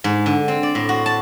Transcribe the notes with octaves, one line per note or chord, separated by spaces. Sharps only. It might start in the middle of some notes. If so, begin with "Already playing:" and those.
G#2
D3
C4
D5
A2
F#4
A5